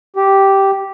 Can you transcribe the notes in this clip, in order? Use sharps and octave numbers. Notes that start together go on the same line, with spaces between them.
G4